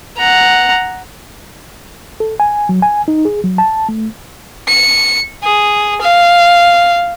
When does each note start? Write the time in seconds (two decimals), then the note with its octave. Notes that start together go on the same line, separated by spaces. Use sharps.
0.17 F#5 A#5
2.20 A4
2.40 G#5
2.69 F#3
2.82 G#5
3.08 D#4
3.25 G#4
3.44 F#3
3.58 A5
3.89 A3
4.68 C#7
5.43 G#4
6.01 F5